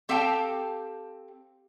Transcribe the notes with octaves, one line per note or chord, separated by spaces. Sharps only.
C4 G4 A4 F5 G5 A5